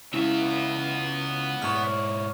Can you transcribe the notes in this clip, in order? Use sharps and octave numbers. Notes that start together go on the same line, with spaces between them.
C#2 G#3 B3 C#4 E4 F4 E5
G#2 E4 C#5 D5 F6 G#6